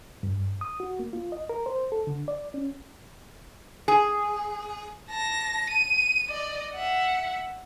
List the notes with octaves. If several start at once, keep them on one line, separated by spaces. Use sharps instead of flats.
G2
D#6
F#4
A#3
F4
D#5
A#4
C5
A4
D3
D5
C#4
G#4
A5 A#6
D#7
D5 D#5
E5 F#5